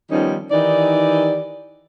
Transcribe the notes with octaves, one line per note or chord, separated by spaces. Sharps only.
D#3 F3 G3 B3 C#4 D#4
D#3 E3 D#4 G4 D5